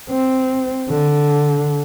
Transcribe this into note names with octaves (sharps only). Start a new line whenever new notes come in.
C4
D3